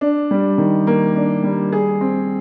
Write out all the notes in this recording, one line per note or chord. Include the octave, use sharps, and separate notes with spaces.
D4
G3
D#3
A#3
D4
G3
G#4
C4